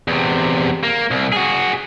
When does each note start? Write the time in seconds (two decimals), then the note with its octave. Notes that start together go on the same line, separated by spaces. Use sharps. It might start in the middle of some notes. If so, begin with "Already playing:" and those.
0.08 E2 C3
0.83 A#3
1.11 C2
1.32 F#4 G#4